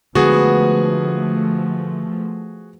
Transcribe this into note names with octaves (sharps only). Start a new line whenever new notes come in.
D3 F3 G#3 A3 B3 D4 F#4 G#4